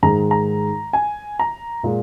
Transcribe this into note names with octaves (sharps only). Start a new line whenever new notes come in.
G#2 D#3 G#3 A#5
A#5
G#5
A#5
A#2 G#3